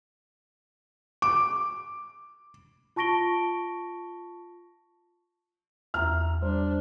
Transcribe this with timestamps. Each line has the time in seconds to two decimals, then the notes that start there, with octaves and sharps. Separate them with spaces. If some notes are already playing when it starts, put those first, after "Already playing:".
1.22 D6
2.96 F4 A5 C#6 A#6 D7 G7
5.94 E2 E5 A#5 F6
6.42 G3 D4 C5